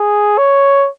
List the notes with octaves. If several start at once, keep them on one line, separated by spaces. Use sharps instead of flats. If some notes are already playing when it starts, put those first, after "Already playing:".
Already playing: G#4
C#5